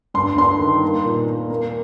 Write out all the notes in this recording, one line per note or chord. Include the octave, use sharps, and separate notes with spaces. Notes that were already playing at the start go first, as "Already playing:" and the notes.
G2 C6
G2 C6
D#3
A#3
A#2
A#3
A#3